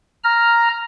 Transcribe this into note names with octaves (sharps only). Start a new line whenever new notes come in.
A#5 F6